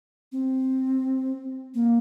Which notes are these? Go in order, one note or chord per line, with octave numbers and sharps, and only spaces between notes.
C4
A#3